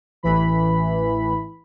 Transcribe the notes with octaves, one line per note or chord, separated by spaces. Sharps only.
A1 E3 B5